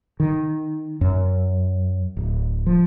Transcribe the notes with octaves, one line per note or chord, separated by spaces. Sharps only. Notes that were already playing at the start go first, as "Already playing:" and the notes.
D#3
F#2
D1
F3